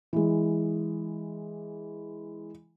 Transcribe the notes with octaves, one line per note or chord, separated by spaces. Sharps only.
E3 G#3